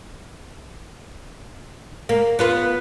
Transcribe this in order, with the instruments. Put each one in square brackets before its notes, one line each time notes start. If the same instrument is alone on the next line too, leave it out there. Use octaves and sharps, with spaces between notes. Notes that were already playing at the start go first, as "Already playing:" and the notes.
[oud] A#3
B3 F4 B4